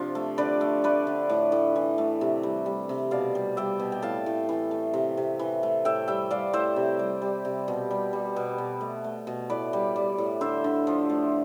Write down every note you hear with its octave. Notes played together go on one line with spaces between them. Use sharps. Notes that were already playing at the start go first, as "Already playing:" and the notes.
Already playing: C3 F3 D4 F4
A3
D3 B4 D5
A3
A3 B4 D5
D3
A2
A2
E3
A3
C3
G3
G3
C3
B2 D5 F5
G3
G3 E5 G5
B2
G5
A2 F5 A5
A2
E3
A3
C3
C3
E3
A3
A2 E5 G5
G3 E5 G5
G3 D5 F5
A2 C5 E5
C3
G3
G3
C3
B2
G3
G3
B2
B2
A3
A3
B2
A2 B4 D5
G3
G3
A2
D3 C5 E5
D3
F3
A3